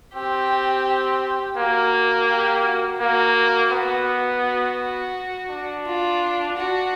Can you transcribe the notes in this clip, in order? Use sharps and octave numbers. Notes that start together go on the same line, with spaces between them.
C4 G4
A#3 F#4
G4
F#4
A#3 F#4
B3
F#4
D4
F4
F#4